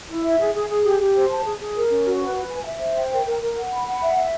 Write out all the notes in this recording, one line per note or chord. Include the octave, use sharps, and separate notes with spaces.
E4
E5
G#4
G#4
G#4
G4
G4
C5
A5
G#4
G#4
A#4
C#4
F#4
B4
B4
G#5
E5
C5
G5
A#4
A#4
A#4
F#5
B5
F#5
E5
E5